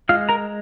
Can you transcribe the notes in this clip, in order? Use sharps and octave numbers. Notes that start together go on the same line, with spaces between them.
G#3 F4 F5
A#4 A#5